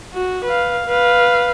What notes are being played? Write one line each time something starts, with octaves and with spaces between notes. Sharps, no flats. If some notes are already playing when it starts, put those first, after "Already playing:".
F#4
B4 F5
B4 F5